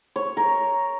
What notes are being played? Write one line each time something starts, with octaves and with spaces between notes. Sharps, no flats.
C#5
A#4